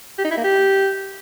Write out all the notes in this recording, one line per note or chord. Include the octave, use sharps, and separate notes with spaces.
G4
D#4
E4
A#3
G4